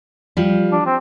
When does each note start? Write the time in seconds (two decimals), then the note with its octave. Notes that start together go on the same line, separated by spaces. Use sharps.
0.37 F3 G3
0.72 D4
0.86 C4